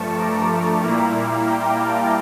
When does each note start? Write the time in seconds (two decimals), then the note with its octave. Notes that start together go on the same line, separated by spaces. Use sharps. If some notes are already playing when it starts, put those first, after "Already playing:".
Already playing: G2 F3 A3 A5 C#6
0.16 A#5 D6
0.81 A#2 G3 A#3 E4
1.45 G5 A#5
1.77 F5 A5